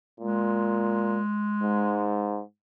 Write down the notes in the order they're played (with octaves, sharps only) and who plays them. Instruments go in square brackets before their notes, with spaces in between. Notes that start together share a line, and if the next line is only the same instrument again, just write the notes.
[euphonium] A#2 [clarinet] G#3
[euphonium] G#2